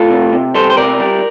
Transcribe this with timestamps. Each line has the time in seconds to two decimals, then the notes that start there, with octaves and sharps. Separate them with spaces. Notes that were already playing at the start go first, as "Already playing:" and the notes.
Already playing: A2 F4 A4
0.10 C3
0.33 C3
0.55 G3 A4 C5
0.70 C5
0.77 C3 A#4 D5
1.00 G3